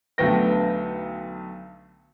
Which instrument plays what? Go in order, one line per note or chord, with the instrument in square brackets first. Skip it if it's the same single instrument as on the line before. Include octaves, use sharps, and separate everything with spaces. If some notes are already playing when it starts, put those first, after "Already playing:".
[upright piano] B1 D3 A3 B3 G5 A#6